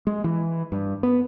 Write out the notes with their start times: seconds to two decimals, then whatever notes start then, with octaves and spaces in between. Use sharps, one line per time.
0.07 G#3
0.24 E3
0.72 G2
1.03 B3